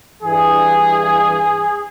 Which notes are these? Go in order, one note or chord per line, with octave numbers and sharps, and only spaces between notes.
G2 E3 G#4